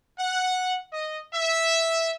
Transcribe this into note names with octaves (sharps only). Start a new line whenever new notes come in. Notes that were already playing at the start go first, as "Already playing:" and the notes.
F#5
D#5
E5